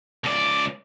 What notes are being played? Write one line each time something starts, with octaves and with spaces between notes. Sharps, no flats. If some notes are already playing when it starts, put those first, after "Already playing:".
C#2 D5